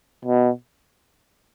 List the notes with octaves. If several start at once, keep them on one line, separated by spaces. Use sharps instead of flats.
B2